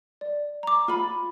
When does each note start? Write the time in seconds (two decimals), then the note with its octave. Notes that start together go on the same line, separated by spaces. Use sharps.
0.21 D5
0.63 A#5 D6
0.88 F4 B5